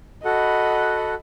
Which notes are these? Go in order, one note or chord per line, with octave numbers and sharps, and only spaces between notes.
F#4 A4 D#5 F#5 B5